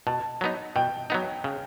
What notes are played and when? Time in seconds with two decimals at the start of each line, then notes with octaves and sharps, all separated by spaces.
0.07 B2 A5
0.41 F#3 B3 D#4
0.76 B2 G5
1.10 F#3 B3 D#4
1.44 C#3